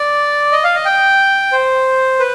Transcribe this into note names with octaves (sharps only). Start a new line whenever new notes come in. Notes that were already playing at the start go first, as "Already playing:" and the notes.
Already playing: D5
D#5
F5
D#5
G5
C5
B4